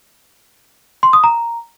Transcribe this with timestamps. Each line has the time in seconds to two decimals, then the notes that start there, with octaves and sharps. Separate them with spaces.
1.03 C6
1.13 D#6
1.24 A#5